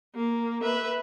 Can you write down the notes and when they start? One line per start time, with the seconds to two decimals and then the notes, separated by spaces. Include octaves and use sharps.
0.15 A#3
0.63 B4 E5